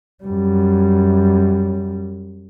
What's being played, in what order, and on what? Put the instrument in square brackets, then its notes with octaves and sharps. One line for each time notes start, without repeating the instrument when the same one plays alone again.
[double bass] F#2 G3